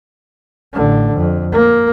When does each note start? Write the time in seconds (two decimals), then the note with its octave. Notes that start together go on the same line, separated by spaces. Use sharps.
0.73 A1 D3
1.15 F2
1.53 A#3